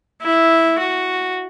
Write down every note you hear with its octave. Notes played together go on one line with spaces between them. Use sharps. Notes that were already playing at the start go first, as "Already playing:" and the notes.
E4
F#4